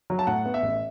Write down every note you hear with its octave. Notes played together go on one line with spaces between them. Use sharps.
F#3
A5
A2 F#5
B3
E5
A1